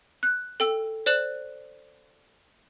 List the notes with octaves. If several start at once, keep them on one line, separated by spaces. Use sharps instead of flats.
F#6
A4 G5 E6
C5 D5 F#6 E7 F#7